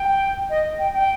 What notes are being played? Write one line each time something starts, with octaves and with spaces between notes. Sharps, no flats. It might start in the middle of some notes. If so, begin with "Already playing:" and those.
Already playing: G5
D#5
G5
G5